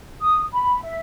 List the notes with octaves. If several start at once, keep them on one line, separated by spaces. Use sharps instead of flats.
D#6
B5
E5